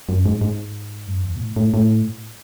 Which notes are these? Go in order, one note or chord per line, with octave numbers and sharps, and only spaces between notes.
F#2
G#2
G#2
F#2
E2
B2
A2
A2
A2